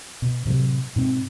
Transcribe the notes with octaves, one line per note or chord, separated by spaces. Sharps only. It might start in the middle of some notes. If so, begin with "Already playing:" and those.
B2
A2 C3 E3 F#3
G#2 B2 C4